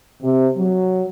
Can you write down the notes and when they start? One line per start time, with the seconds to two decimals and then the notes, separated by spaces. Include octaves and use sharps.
0.23 C3
0.57 F#3